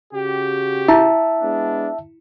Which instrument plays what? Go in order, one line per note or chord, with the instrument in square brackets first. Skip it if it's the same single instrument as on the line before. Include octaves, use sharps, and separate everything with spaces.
[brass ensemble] C#3 F#4 G4
[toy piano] E4 [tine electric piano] E5 A5
[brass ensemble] G#3 B3 D4